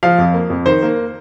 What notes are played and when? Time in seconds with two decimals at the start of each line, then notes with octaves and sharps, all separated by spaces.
0.03 F3 F5
0.18 F2
0.34 A#3
0.50 F2
0.66 D#3 C5
0.83 A#3